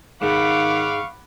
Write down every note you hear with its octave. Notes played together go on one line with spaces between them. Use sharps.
G#2 D#3 F5 F#5 B5 C#6 D6